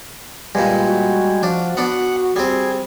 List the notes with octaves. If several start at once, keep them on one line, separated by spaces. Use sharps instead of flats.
G2 A#2 G3 G#3 G#5
F#4
F3 D4
B3 D4 F#5
G3 C4 G#4